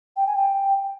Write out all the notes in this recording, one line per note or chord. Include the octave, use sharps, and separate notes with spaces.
G5
G#5
G5